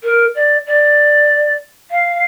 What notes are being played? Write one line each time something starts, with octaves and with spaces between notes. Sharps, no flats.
A#4
D5
D5
F5